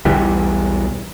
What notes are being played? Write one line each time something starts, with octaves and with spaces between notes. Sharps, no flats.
B1 E2 E3 G3